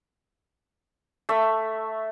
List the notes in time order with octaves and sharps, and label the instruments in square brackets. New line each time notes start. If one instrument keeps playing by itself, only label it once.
[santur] A3 E5